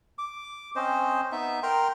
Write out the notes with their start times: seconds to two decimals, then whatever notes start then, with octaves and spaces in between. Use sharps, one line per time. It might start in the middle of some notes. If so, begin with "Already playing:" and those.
0.18 D6
0.76 C4 C#4 C5 D#5
1.32 B3 D#4 E5
1.63 A#4 G5 A#5 C6